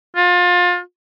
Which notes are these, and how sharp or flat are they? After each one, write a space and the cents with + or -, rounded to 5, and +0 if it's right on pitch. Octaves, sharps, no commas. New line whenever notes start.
F4 +30